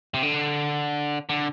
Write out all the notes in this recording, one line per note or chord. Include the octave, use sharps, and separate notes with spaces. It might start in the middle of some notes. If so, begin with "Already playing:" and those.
C3
D3
D3